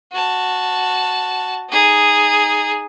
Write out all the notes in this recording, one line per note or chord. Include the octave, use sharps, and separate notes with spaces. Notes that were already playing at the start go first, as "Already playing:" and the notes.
F#4 A5
D#4 G#4